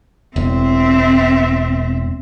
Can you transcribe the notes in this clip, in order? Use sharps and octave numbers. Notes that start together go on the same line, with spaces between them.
E1 C4 E5